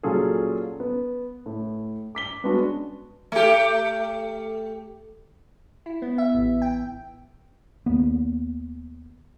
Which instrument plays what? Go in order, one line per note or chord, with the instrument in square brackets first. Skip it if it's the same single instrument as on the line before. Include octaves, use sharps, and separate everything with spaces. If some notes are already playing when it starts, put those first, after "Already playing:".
[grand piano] A#2 F#3 C#4 F4 G#4 A4
B3
A2
D6 B6 G7
G#3 B3 C#4 D4 F#4
[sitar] A3 G4
[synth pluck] E4
B3
E5
A1
G5
[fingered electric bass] D#2 A#3 B3